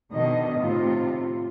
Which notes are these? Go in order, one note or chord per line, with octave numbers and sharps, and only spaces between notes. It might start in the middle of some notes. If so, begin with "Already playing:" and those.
B2 D3 D#3 D#5
A2 C3 F4